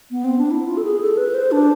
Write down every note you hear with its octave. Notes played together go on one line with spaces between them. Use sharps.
B3
C4
D4
E4
F4
A4
G#4
A4
B4
C5
D4